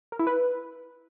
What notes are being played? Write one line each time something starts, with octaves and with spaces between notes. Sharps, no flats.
A#4
E4
B4